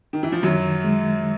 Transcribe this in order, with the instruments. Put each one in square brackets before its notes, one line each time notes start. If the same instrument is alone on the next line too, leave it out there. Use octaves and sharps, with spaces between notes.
[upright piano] D#3
E3
F3
[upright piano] F#2 F#3 [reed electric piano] D#3
[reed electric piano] G#3